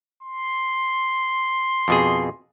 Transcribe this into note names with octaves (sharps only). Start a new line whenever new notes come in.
C6
F2 B2 G#4